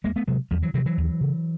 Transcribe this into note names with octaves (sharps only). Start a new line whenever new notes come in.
E2 G#3 A#3
A3 B3
C3 F#3 G#3
E2 F3 G3
E3 F#3
C3 E3 F#3
E3 F#3
D#2
C#3